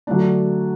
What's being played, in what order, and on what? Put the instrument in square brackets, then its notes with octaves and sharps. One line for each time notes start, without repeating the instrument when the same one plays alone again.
[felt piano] D3 F#3 A3 D4